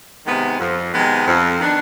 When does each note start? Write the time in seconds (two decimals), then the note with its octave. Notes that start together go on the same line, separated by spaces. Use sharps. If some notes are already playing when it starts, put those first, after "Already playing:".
0.25 C3 D#3 G#3 B3
0.59 F2
0.92 C3 D#3 G#3 B3
1.26 F2
1.60 D#3 B3 D4